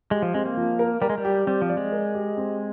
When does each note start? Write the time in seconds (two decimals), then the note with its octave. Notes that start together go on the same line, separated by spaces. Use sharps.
0.11 G#3 G4
0.22 F3
0.34 G#3 C4
0.46 A#3
0.57 F3
0.79 A#4
1.02 G3 A#4
1.10 G#3
1.18 G3
1.25 G4
1.47 G3 C4
1.62 F3
1.70 D5
1.77 G#3
1.92 A#4
2.14 G4
2.37 C4